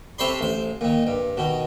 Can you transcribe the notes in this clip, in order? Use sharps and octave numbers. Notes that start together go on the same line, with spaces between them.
C3 A4 C5 C#5 B5 C6
A1 C5
A#2 D#3
G2
B2 D#3